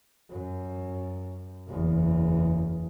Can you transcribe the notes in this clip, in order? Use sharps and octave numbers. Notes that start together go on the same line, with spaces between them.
F#2
F#1 E2